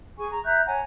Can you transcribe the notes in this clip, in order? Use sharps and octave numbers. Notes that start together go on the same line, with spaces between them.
G#4 G#5 C#6
A#5
E5 A#5 F#6 G6
C#5 F#5 G#5 A#5